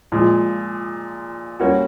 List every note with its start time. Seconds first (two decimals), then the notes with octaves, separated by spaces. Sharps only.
0.12 A#2 F3 G#3
1.60 G3 A#3 C#4 F#4